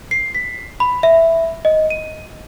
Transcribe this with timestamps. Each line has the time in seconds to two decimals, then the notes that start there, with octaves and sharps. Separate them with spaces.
0.11 C7
0.35 B6
0.80 B5
1.03 E5
1.65 D#5
1.90 D#7